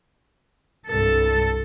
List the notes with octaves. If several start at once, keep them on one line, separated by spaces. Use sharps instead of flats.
C2 G2 A4